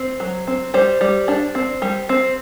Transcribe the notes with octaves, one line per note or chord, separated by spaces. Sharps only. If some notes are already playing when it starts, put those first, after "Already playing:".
Already playing: C4
F#3
C4
G3 C5
G3
D4
C4
G3
C4